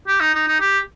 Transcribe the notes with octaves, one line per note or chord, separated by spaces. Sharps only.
G4
D#4
D#4
D#4
G4